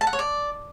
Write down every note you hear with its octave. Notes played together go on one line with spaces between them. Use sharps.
A5
F#5
C#5
D5